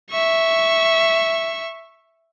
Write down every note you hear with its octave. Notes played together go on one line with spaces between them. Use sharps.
E5 C#6